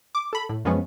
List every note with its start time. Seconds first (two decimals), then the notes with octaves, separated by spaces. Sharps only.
0.15 D6
0.33 A4 B5
0.49 A2
0.65 F#2 F3 G#3 B3 C#4